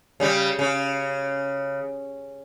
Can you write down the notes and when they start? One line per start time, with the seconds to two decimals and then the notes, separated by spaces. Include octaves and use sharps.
0.20 C#3 G3
0.59 C#3